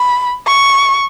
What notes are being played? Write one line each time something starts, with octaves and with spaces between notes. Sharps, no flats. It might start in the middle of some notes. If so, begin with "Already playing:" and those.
Already playing: B5
C#6